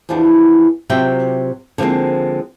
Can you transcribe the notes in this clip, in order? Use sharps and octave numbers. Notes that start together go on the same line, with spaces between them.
E2 E3 F3 D4 F#4
C3 F#3 F4 C5 E5 G5
D3 F3 G#3 A#3 C4